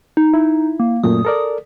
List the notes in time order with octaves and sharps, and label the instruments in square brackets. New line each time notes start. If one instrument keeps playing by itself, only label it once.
[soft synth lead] D#4
[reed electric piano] E4
[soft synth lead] A#3
[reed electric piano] F#2 A#2 A3 [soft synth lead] D#6
[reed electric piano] A4 A#4 D5